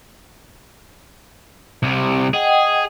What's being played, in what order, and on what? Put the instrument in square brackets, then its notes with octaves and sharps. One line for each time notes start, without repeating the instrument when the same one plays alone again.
[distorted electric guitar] C2 C3
[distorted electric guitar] G#4 [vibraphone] D#5 F#5 G5